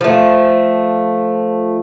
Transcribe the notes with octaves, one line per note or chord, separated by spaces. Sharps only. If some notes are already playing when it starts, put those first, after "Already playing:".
F3 A3